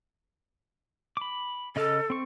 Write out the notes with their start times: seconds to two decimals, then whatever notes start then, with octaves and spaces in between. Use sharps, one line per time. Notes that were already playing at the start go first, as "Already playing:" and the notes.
1.17 B5 D6
1.76 C#3 A4 D#5 F6
2.10 C4 C#6